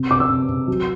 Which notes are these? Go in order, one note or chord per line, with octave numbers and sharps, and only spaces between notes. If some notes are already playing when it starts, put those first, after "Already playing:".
Already playing: C3
C3 D6
E6
C3
C3
F#3